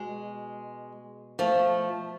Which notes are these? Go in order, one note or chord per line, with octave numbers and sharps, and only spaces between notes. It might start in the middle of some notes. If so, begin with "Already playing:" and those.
Already playing: B2 G#3
F3 A3